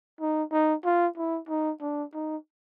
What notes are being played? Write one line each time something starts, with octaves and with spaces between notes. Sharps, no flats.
D#4
D#4
F4
E4
D#4
D4
D#4